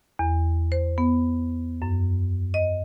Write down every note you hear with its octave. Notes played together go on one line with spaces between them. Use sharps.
E2
C5
B3
F#2
D#5